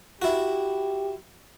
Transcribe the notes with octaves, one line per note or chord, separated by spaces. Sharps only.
E4 F#4 G4